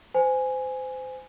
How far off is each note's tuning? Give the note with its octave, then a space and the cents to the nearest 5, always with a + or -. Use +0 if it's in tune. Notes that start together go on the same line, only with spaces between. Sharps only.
C5 -30 G#5 +0